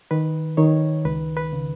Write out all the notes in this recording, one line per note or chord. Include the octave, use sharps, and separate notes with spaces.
D#3 B4
D#3 C#5
C#2 B4
B4
C#3